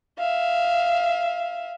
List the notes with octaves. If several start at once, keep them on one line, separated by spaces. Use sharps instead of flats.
E5 F5